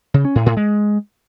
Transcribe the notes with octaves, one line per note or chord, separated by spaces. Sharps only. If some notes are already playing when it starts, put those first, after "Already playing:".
C#3
C#4
A2
A2
G#3